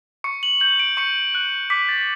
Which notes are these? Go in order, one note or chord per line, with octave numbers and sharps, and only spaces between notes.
C#6 C#7
F#7
G6 F#7
D7
C#6 C#7
F#6
D6 B6
A6